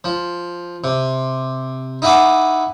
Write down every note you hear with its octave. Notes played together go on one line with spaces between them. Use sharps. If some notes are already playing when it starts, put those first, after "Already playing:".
F3
C3
D#4 E4 F#5 G#5 D6